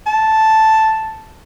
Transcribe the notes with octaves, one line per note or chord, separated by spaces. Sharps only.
A5